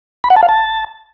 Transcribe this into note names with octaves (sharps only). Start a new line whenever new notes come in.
B5
F#5
A5
F5
A5